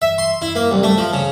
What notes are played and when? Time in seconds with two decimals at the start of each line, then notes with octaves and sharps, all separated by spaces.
0.02 E5
0.18 C6
0.42 E4
0.56 A#3
0.72 C2
0.83 A3
0.98 F3
1.13 C#3